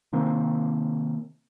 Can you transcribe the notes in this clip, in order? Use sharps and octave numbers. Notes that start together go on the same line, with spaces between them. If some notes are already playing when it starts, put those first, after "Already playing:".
C3 D#3 A#3 C4